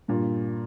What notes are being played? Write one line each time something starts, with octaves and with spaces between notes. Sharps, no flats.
G2 A#2